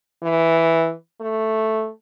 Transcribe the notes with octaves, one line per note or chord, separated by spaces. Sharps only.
E3
A3